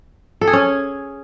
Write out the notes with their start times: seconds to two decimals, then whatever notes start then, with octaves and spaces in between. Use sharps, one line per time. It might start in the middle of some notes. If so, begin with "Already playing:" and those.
0.41 A4
0.47 G#4
0.53 C#4